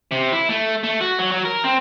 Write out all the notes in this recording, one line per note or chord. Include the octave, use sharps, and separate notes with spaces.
C3
E4
A3
A3
F#4
F#3
F#3
A#4
C4